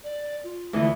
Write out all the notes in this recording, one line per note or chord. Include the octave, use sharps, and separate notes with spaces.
D5
F4
D2 E3 D#5